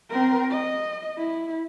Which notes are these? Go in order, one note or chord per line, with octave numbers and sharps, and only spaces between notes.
C4 A#4
D#5
E4